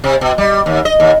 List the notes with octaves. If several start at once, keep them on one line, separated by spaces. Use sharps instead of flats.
C3
B2
G3
D#2
D#5
D#2